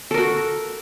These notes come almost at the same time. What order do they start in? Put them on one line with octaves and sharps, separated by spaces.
A4 A#4 F#4